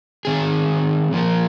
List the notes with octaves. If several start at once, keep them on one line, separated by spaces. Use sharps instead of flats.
D#3 C4 G#4
F3 A#3 F4 A#4